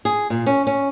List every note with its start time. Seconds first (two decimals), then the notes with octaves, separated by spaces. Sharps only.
0.05 G#4
0.30 A#2
0.46 C#4
0.67 C#4